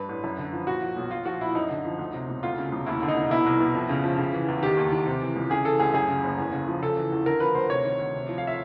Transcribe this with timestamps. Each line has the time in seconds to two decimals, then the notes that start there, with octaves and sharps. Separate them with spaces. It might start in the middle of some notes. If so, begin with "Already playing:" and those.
Already playing: G2 B4
0.09 A1
0.24 F#2
0.38 D3
0.53 F3
0.67 A#2 F#4
0.82 F3
0.97 B1
1.11 A#2 F4
1.26 F3 F#4
1.41 A#1 E4
1.55 F#2 D#4
1.70 D3
1.85 F3
1.98 D2
2.14 C3
2.28 E1
2.43 D2 F4
2.58 C#3
2.72 E1
2.86 D#2 E4
3.02 D3
3.08 D#4
3.16 F1
3.31 B2 E4
3.46 C2
3.60 B2
3.75 F2
3.89 C#3
4.04 F3
4.18 C#3
4.33 E3
4.48 E2
4.62 D#3 G4
4.77 D#2
4.92 D#3
5.06 C3
5.21 E3
5.36 C#2
5.50 C#3 G#4
5.65 E3 A4
5.79 D2 G#4
5.94 F#2 G#4
6.09 C#3
6.24 F#1
6.38 E2
6.52 C#3
6.67 F3
6.82 C#3 A4
6.97 E3
7.12 E2
7.26 D3 A#4
7.40 F3 B4
7.55 D2 C5
7.70 C3 C#5
7.85 D#3
7.99 D2
8.14 C3
8.29 F3
8.38 F5
8.47 E5